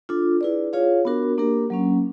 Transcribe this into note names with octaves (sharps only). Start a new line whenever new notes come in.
D4 F4 A4
E4 G#4 B4 D5
F4 G#4 C#5 F5
B3 D4 F#4 A#4
A#3 D4 G4 A#4
F#3 A#3 C#4